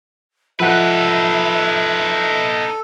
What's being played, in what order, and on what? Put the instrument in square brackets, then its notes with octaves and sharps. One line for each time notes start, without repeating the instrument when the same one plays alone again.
[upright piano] F3 F#5 F#6 [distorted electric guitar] D#4 B4 [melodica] A4 [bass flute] E5